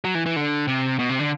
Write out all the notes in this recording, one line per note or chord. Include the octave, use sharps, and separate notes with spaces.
F#3
E3
E3
D3
C3
B2
C3
D3